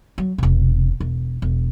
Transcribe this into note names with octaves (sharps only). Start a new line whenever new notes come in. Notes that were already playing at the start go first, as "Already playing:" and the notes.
F#3
E1 C3
E1
E1